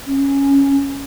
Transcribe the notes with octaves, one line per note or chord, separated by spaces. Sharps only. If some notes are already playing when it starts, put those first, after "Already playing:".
C#4